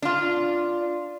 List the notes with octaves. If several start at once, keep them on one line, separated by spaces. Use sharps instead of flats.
D4 F4